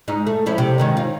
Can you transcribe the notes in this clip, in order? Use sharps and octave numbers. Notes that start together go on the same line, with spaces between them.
G#2 D#4
A3
F3 C#4 E4
C3
G#2 D#3 C#4
D#4 F4